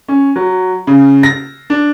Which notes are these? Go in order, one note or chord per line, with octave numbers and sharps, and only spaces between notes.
C#4
F#3
C#3
A#6
D4